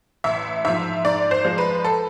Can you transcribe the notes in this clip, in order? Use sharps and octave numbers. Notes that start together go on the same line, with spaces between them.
A1 E5
G#2 F3 E5
G#2 D5
C5
F3 G#3
B4
A4